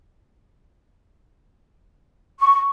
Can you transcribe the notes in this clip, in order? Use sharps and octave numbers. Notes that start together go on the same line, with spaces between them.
C#6